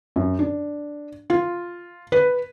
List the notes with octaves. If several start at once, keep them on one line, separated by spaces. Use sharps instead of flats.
F#2
D4
F4
B4